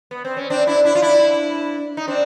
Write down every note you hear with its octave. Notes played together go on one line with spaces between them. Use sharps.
B3
C4
C#4
C4 D4
D4 E4
D4 E4
F4
D4 E4
D#4
C4 D4